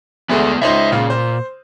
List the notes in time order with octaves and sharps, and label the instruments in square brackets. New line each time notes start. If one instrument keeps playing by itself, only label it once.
[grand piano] D2 G#3 A3 [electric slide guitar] B3 G#4
[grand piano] C#2 D#4 C5 [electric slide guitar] C#5 E5
[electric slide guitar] A#2 [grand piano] C#3 F4
[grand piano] C5